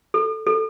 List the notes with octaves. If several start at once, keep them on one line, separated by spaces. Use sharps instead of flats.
A4
A4